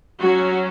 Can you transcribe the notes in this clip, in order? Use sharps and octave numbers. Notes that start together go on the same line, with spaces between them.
F#3 C#4 F#4